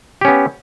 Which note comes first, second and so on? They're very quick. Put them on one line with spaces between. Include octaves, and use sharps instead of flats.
G4 C#4 B3